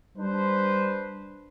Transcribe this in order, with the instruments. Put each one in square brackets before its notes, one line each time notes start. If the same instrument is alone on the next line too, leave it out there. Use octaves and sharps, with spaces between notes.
[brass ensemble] G3 D4 B4 C5